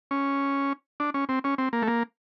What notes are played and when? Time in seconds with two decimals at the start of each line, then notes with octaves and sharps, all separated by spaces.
0.11 C#4
1.00 D4
1.14 C#4
1.29 C4
1.44 C#4
1.58 C4
1.73 A#3
1.82 A3
1.88 A#3